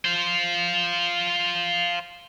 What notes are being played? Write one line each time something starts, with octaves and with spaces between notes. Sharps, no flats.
F4 C5